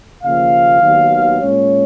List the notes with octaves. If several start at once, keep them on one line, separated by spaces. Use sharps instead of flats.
D#2 C#3 F3 A#3 F5
D#2 D#3 F#3 B3
A#2 G#3 C#4 C#5